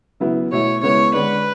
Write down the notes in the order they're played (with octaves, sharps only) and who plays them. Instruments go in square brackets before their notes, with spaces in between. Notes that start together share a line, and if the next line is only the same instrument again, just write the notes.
[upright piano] C#3 F#3 B3 E4
[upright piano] B2 A3 E4 [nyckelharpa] C#5
[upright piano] C#3 G#3 B3 E4 [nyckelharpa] C#5
[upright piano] D3 G#3 D4 [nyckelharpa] B4